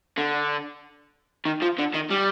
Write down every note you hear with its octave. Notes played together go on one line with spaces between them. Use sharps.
D3
D#3
F3
D3
D#3
G3